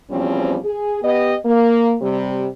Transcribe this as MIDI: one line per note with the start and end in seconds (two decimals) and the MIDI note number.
0.10 0.58 40
0.10 0.58 47
0.10 0.58 53
0.10 0.58 55
0.10 0.58 60
0.10 0.58 61
0.65 0.98 68
1.02 1.36 59
1.02 1.36 67
1.02 1.36 75
1.45 1.95 58
2.02 2.47 48
2.02 2.47 55